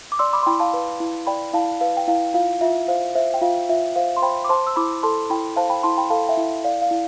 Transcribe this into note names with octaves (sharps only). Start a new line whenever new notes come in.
D6
D5 C6 E6
B5 D6
C6
E4 G5 B5
F5 A5
B4
E4
D5 G5 B5
E4 F5 A5
B4 F5
G5
E4 F5
F4 F5
F4 E5
C5 F5
C5 E5
G5
F4 F5
F4 E5
C5 F5
C6
C5 G5 B5
D6
C5 A5 C6
E6
E4 B5 D6
A4 A5 C6
E4 G5 B5
C5 F5 A5
G5 B5
E4 A5 C6
G5 B5
A4 F5 A5
E5 G5
E4
D5 F5
F5
E4